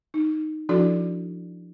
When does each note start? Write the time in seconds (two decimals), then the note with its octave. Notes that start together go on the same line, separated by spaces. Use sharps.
0.14 D#4
0.69 F3 D4 E4 F#4 A4 D5